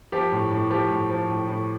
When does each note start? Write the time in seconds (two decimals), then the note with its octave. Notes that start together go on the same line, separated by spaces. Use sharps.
0.12 F3 G4
0.32 A2
0.51 A2
0.70 F3 G4
0.90 A2
1.09 F3
1.28 A2
1.47 A2